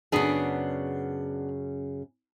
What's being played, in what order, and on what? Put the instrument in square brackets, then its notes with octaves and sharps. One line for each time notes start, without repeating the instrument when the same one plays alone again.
[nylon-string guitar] F#2 C#3 [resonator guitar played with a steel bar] B3 D4 G#4